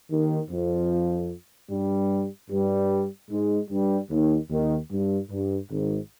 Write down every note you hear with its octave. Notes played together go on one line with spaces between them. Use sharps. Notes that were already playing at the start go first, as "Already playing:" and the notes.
D#2 D#3
F2 F3
G2 G3
G2 G3
G#2 G#3
G2 G3
D#2 D#3
D#2 D#3
G2
G2
G#1 G#2